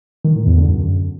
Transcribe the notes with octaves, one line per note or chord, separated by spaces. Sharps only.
D#3
A2
E2
D3
F#2